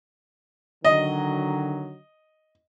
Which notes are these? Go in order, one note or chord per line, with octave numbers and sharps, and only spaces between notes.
D3 D#3 F#3 D#5